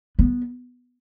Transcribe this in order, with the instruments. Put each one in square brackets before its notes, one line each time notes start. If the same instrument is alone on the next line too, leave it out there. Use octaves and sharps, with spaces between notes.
[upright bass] B3